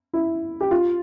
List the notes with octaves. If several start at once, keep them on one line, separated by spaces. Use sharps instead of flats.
E4
G4
F4